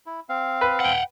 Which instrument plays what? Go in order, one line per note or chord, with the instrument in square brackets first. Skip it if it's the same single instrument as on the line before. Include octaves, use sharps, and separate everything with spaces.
[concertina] E4
C4 F5
[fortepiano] B4
[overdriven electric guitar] F#5 G5